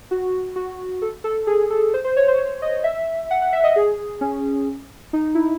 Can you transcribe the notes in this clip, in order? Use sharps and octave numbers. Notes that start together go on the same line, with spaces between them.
F#4
F#4
A4
A4
G#4
A4
C5
C5
C#5
C5
D#5
E5
F#5
F#5
E5
D#5
G#4
C#4
D#4
E4